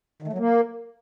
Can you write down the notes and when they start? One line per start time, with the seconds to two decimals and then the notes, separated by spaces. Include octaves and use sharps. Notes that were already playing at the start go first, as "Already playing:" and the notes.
0.22 D#3
0.28 A3
0.33 F#3
0.38 A#3